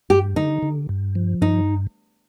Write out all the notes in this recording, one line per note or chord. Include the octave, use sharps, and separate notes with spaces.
G2 G4
D3 D#4
D3
G2
F3
G2 D#4